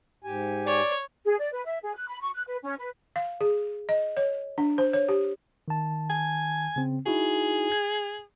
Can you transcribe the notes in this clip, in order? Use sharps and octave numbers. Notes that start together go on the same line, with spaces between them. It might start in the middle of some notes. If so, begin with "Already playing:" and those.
G#2 G4 G#5
C#5 D5
G#4
D5
B4
E5
G#4
F#6
B5
C#6
F#6
B4
C#4
B4
F5
G#4
D#5
C#5
D4
C5
C#5
G4
D#3 A5
G#5
C#3 C4
D#4 E4 F#4 G#4
G#6